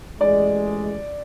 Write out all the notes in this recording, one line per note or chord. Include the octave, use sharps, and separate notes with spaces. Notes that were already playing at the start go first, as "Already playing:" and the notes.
A1 G#3 D5